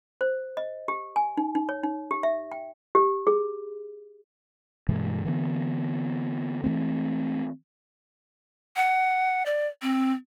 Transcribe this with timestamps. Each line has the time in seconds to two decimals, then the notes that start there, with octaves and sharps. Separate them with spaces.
0.21 C5
0.57 D#5
0.88 G4
1.16 G#5
1.37 D#4
1.55 D#4
1.69 C#5
1.83 D#4
2.11 G4
2.23 E5
2.51 G5
2.95 G4
3.27 G#4
4.88 G2 B2 E3 G#3
5.24 D3 E3 B3
6.64 E3 F3 A3 C4
8.76 F#5
9.46 D5
9.82 C4